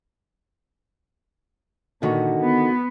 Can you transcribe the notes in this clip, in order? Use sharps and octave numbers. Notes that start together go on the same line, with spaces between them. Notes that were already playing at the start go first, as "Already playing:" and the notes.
A#2 D3 D#3 F#4
B3